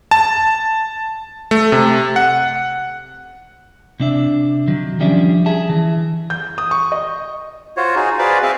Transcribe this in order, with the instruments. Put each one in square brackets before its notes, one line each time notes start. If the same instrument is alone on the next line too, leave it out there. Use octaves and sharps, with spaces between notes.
[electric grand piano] A5
A3
C3
F#5
[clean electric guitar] C3 D4 E5
D#3 F#3
F3 G3 C#4 D4 E5
G#4 E5 A5
E3
[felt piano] G6
D#6
C#6
D#5
[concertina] F4 F#4 C5 C#5
D#4 F#4 G#4
F#4 G#4 B4 C5 D5 F5
C4 G#4 E5 F5